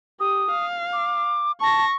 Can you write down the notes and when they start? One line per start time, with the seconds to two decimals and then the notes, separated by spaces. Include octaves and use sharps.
0.20 G4 D#6
0.51 F5
0.93 D6
1.61 A5 C#6 A#6